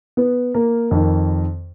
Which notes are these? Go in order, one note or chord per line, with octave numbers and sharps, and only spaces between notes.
B3 B4
A#3 A#4
F2 D#3